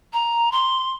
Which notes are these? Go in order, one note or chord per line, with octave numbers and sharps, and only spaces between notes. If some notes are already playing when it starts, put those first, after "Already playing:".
A#5
C6